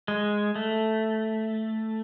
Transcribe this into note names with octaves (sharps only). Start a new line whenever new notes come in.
G#3
A3